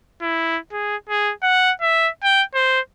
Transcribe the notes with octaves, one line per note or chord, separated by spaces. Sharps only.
E4
G#4
G#4
F#5
E5
G5
C5